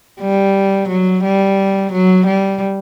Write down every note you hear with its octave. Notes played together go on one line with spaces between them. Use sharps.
G3
F#3
G3
F#3
G3